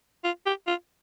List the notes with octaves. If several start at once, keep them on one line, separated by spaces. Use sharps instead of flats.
F4
G4
F4